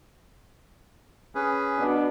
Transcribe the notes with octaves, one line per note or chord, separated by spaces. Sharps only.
C#4 G#4 B4
B2 D4